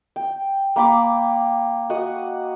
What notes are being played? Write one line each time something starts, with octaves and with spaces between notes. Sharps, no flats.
G5
A#3 G5 B5 D6
F#4 D#5 F#5 D#6